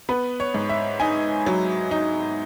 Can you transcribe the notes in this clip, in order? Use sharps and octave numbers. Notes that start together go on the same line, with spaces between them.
B3 B4
C#5
G#2
E5
D#4 G#5
F#3
D#4